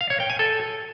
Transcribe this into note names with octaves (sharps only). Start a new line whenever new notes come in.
F5
C#5
G5
G#5
A4